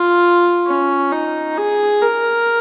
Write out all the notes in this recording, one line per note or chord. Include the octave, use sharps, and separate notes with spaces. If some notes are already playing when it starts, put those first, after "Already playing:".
Already playing: F4
C#4
D#4
G#4
A#4